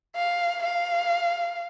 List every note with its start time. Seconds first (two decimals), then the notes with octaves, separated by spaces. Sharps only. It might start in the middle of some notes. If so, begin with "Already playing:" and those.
0.16 F5
0.63 F5